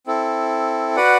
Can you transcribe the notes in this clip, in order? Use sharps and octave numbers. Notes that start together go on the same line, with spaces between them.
C4 E4 A4
F#4 B4 D5 F#5